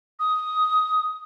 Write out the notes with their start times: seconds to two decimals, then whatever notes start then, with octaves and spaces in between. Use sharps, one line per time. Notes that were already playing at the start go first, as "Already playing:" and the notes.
0.19 D#6